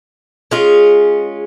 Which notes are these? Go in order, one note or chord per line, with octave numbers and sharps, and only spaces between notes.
G#3 C#4 F4 G#4